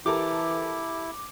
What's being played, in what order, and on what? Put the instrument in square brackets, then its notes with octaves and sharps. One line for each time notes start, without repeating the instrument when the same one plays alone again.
[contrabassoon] E3 [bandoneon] E4 [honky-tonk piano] G4 A4 A#4 [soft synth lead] D6